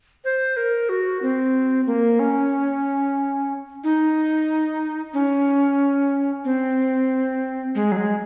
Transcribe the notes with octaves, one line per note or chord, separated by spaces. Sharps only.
C5
A#4
F#4
C4
A#3
C#4
D#4
C#4
C4
G#3
F#3
G#3